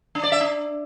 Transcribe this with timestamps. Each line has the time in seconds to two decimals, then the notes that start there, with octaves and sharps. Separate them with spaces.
0.15 D4
0.23 D5
0.32 E5
0.40 D4